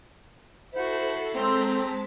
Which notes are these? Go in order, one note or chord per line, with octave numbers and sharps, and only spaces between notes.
E4 F#4 A4 C5 C7
G#3 C4 A4 A5 A#5 B6